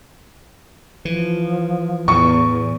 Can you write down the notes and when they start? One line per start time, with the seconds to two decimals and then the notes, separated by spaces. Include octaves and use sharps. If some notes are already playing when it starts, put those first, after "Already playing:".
1.05 E3 F3
2.08 E2 A2 E3 C#6